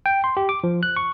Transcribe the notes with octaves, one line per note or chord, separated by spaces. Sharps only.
G5
C6
G4
D6
F3
F#6
C#6